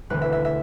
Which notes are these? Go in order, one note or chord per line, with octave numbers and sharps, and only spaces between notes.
E1 D2 D3 B4
E5
E5
E5